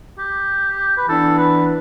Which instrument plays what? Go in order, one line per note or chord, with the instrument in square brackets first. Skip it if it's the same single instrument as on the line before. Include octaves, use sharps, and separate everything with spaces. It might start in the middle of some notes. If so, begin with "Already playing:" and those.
[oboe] G4
B4
[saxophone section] E3 B3 D4 [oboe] A4
[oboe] B4